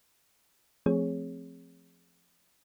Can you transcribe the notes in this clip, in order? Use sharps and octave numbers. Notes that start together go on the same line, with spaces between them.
F3 A3 C4 G#4 C#5